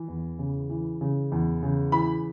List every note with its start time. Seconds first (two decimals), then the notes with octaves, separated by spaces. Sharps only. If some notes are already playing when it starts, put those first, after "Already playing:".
Already playing: E3
0.08 E2
0.39 C#3
0.70 E3
1.01 C#3
1.32 E2
1.63 C#3
1.92 E3 B5